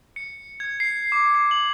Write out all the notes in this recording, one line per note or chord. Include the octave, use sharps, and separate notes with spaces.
C#7
G#6
C7
D6
C7
F#7